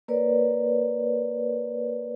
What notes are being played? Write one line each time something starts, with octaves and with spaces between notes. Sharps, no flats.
A#3 A#4 B4 C#5 D5